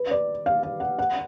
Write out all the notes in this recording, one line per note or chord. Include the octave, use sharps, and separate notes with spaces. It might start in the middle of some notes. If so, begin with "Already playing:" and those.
Already playing: B4
D5
F5
F5
F#5
F#5